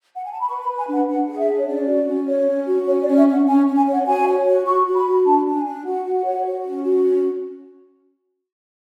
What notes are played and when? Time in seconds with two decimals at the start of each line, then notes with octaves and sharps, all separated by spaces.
0.15 F#5
0.24 G#5
0.32 A5
0.41 B5
0.49 B4 C#6
0.63 B5
0.68 B4
0.78 G#5
0.87 D4
0.93 F#5
1.08 D4 F#5
1.28 G#4 F#5
1.38 E5
1.47 D4
1.58 C#5
1.67 C#4 D5
1.87 F#4
2.07 C#4
2.28 C#5
2.47 C#4
2.66 F#4
2.87 C#4 C#5
3.01 D5
3.07 C#4
3.16 E5
3.27 C#4 F#5
3.46 C#4 G#5
3.66 C#4
3.76 G#5
3.87 C#5 F#5
4.06 F#4 G#5
4.26 C#5
4.46 F#4
4.66 F#4 C#6
4.86 F#4
4.95 B5
5.06 F#4
5.25 D4 A5
5.46 D4
5.55 G#5
5.65 D4
5.85 F#4 F#5
6.05 F#4
6.25 C#5
6.45 F#4
6.65 C#4
6.84 F#4
7.04 C#4